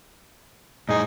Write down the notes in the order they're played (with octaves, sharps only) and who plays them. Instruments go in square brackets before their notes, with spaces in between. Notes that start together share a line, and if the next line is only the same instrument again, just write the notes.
[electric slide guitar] A2 G#4 [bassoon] D#4